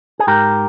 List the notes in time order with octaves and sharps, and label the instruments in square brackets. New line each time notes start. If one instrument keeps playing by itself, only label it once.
[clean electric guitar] G#4
G#2 G4 A#4